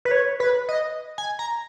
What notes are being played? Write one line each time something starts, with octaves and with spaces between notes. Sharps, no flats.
B4
C#5
B4
D#5
G#5
A#5